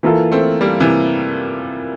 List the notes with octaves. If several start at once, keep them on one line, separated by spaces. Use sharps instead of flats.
E3 A#3 F4 A4
A3 C4
G3 A#3
C3 E3